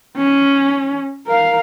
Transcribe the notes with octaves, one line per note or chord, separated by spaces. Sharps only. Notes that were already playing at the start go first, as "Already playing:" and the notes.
C#4
A#4 F5